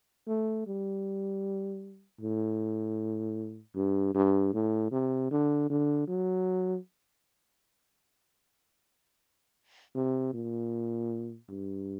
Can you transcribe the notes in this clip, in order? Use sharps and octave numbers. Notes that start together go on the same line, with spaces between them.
A3
G3
A2
G2
G2
A2
C3
D3
D3
F#3
C3
A#2
G2